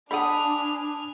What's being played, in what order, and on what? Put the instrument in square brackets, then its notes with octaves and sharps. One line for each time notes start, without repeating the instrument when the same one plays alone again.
[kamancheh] D4 [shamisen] A4 D5 F#5 [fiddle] G#5 F6 [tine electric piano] B5 D#6